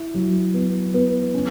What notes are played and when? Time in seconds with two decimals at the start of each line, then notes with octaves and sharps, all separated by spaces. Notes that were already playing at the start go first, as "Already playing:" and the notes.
Already playing: E4
0.14 F#3
0.54 B3
0.94 B3
1.34 C#4